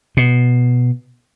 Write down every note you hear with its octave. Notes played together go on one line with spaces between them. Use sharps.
B2